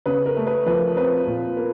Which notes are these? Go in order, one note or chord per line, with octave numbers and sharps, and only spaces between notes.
C#3 B4
A#4
A3
B4
F3 B4
C4 B4
A#2
A#3